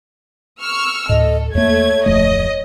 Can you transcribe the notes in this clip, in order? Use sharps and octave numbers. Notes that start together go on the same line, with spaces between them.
C#6 E6 F6
D2 A2 A4 D#5
E2 A3 A#3 C#5 G#6
D1 F2 A3 D#5